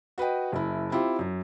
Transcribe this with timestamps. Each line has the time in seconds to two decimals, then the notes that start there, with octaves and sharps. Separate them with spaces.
0.18 F#4 B4 D#5 G5
0.52 F#1 E4
0.91 C4 E4 F4 G4
1.19 F#2